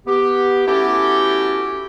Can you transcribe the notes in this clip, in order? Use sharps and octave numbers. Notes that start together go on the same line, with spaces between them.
B3 G4
A3 B3 C#4 E4 F#4 G4